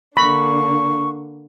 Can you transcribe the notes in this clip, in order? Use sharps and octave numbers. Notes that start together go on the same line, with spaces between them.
D3 A#3 D4 B5 C#6